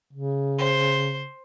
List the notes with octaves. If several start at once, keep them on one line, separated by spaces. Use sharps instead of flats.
C#3
C5